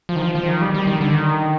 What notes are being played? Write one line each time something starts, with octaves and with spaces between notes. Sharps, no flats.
F3
D#3
F3
F3
D#3
G3
G3
D#3
D3
D#3